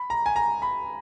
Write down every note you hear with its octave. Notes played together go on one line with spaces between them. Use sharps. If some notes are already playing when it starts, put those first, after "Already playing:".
Already playing: B5
A#5
G#5
A#5
B5